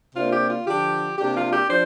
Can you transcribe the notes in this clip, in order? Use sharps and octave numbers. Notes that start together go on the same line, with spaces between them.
C3 A#3 D4 F4
G4
F4
D3 F3 D4 G4
C3 A#3 D4 G4
F4
G4
F3 D4 C5